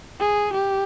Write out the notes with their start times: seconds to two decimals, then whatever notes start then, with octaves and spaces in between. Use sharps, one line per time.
0.20 G#4
0.54 G4